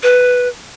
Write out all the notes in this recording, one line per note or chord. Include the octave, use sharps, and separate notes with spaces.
B4